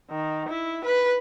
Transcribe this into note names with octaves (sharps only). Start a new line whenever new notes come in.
D#3
E4
B4